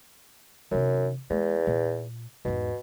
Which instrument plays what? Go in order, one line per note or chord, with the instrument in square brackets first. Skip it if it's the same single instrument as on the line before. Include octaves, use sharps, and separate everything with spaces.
[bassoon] F#2 [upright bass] C3 D#3
[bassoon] E2 [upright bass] G#3
[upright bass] A#2
[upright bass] E2 G#2 [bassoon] B2